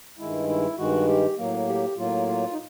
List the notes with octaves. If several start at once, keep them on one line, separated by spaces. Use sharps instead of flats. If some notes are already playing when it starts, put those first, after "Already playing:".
G2 D#3 G#3 E4
E4
G2 D#3 G#3 F#4
G4
A2 F#3 A#3
G4
A2 F#3 A#3 F4
F4
D#4